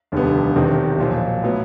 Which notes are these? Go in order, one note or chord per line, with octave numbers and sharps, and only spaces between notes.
F1 D#2 D3 G3 B3
E1 E2 C3 D#3
B1 A#2 F3
A2 F#3 B3